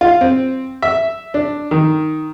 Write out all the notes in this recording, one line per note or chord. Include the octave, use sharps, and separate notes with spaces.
F4
C4
E5
D4
D#3